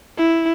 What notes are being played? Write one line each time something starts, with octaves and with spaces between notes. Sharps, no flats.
E4